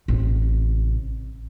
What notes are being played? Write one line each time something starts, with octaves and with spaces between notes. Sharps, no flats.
A1 C3